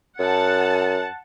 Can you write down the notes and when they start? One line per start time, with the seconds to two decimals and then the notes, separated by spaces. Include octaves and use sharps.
0.19 F#2 F#5 A5